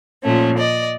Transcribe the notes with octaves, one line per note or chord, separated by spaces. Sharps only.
A#2 F3 A3 C#4
D5 D#5